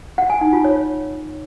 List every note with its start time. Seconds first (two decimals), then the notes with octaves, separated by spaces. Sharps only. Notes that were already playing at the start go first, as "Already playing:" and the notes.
0.18 F#5
0.30 G#5
0.41 D#4
0.53 F4
0.64 C#5